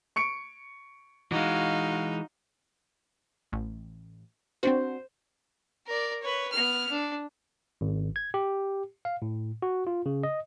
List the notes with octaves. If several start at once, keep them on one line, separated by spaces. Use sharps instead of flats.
C#6 C#7 D7
E3 G#3 D#4 F#4 F5
A1
C4 D4 F#4 C5
A#4 D5
B4 C#5
B3 F6
D4
G#1
G#6
G4
F5
A2
F#4
F4
C#3
D#5